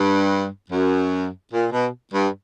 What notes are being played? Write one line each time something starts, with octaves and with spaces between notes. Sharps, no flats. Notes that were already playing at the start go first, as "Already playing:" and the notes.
Already playing: G2
F#2
A#2
B2
G2